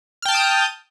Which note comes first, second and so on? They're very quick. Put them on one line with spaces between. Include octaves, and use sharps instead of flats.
F6 G5 A5 G6 D#6